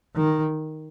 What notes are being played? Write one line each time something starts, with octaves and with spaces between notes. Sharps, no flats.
D#3